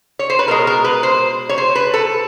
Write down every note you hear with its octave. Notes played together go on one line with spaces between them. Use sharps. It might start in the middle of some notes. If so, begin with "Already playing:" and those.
C#5
C5
B4
B2 G#3 A#4
A#4
B4
C5
C#5
C5
B4
A4